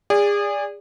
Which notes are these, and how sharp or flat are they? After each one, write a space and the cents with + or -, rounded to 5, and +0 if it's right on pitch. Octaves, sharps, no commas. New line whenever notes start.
G#4 -30 D5 -10